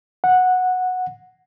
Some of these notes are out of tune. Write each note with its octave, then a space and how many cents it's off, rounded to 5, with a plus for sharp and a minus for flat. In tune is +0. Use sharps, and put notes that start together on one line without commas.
F#5 -10